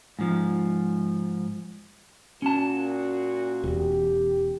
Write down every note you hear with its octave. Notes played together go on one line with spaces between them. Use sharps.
G#2 F3
A#2 C#4 F#4 A5
E1 E2 G4